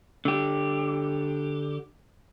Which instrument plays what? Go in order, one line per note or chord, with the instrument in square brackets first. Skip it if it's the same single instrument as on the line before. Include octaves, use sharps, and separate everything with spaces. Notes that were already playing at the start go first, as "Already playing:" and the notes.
[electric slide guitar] D3 G4